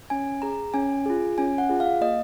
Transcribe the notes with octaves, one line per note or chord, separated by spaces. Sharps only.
C#4 G#5
G#4 A#5
C#4 G#5
F4 G#4
C#4 G#5
F#5
F4 G#4
F5
A#3 D#5